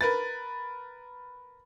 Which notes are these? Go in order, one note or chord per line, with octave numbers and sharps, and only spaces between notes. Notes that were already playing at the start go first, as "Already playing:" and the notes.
A#4 B4 A6